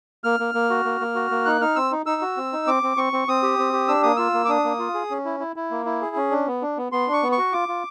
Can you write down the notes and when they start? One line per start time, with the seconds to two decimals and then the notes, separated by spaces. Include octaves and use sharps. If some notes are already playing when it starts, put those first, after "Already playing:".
0.24 A#3 F6
0.40 A#3
0.54 A#3
0.70 F#4
0.85 A#3
1.01 A#3
1.15 F#4
1.31 A#3
1.45 D#4 F#6
1.61 D#4 F6
1.76 C4 E6
1.92 D#4
2.06 D#4 E6
2.22 F#4
2.37 C4
2.53 D#4
2.67 C4 D6
2.83 C4
2.97 C4 C#6
3.13 C4
3.28 C4 D#6
3.43 G4
3.59 C4
3.73 G4
3.88 D4 E6
4.03 A#3 D#6
4.17 F4 E6
4.34 A#3
4.45 D6
4.49 D4 D#6
4.64 A#3
4.79 F4
4.94 G#4
5.11 C#4
5.25 E4
5.40 E4
5.56 E4
5.71 A#3
5.86 E4
6.02 G#4
6.16 C#4
6.31 D4
6.47 B3
6.62 D4
6.78 B3
6.92 B3 C6
7.08 D4
7.13 C#6
7.23 B3
7.32 C#6
7.38 F#4
7.53 F4 D6
7.68 F4